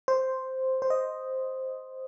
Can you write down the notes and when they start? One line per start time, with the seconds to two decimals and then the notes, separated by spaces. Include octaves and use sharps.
0.08 C5
0.82 C5
0.90 D#5